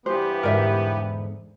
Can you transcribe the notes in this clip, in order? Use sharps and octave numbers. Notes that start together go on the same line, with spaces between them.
G2 E3 B3 G4 C5
E2 G#2 D3 A#4 D5 E5